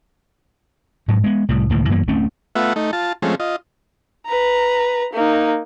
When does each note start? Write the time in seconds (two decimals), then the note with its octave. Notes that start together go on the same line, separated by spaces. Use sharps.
1.08 G#2 F#3
1.24 G#3 B3
1.49 C2 A2 G3
1.70 C#2 A2 D#3 A#3
1.90 F#2 E3 A#3 B3
2.08 D1 A3 C4 C#4
2.55 A3 B3 F4 E5 F#5
2.76 A3 D#4
2.93 F4 A5
3.22 F3 G#3 A3 C4 C#4
3.40 F4 D#5
4.27 B4 A#5
5.13 A#3 D#4